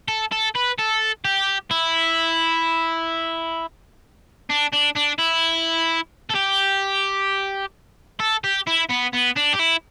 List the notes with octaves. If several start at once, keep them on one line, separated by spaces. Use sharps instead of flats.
A4
A4
B4
A4
G4
E4
D4
D4
D4
E4
A4
G4
A4
G4
E4
B3
B3
D4
G4
E4